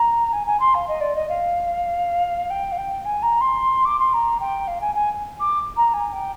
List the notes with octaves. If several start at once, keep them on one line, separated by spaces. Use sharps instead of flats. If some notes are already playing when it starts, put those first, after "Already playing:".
Already playing: A#5
G#5
G#5
C6
F5
D#5
D5
D#5
F5
G5
F5
G5
G#5
A#5
C6
D6
C6
A#5
G5
F5
G#5
G#5
D6
A#5
G#5
G5